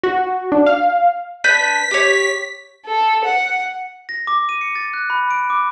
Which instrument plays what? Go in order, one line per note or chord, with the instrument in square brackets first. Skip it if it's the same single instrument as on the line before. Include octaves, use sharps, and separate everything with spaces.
[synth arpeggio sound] F#4
D4
F5
[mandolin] D4 B4 G6 [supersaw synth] B6
[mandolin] G4 C#5
[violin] A4
F#5
[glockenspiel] A#6
D6
D#7
C#7
A6
F#6
B5
D7
D6